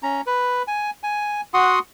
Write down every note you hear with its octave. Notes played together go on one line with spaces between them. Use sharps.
C#4 A#5
B4
G#5
G#5
F#4 F#5 C6 D#6